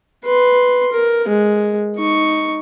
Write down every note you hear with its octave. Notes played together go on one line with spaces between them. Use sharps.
B4 C6
A#4
G#3
D#4 C#6